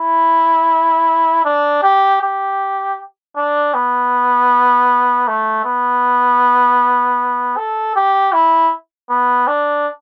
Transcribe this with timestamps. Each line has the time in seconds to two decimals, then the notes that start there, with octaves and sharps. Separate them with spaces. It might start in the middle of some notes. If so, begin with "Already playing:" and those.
Already playing: E4
1.45 D4
1.83 G4
2.22 G4
3.37 D4
3.74 B3
5.27 A3
5.65 B3
7.57 A4
7.95 G4
8.33 E4
9.10 B3
9.48 D4